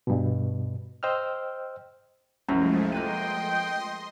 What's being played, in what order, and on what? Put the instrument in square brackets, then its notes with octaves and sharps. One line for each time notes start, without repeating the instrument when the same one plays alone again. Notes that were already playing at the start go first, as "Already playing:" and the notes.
[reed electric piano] G2 B2
C5 D#5 G5 E6 F6
[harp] C2 [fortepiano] F#2 [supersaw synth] F3 G#3 A3
[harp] A#3 B4 D#7 [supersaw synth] D#5 C6 [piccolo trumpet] G5